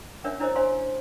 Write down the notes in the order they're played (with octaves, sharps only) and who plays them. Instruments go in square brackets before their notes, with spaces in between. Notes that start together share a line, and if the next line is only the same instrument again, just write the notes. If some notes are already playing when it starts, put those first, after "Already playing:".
[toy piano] C#4 D4 A#4 C#5 E5
D4 E4 A#4 C5 C#5 D#5
C5 F5 G#5 C6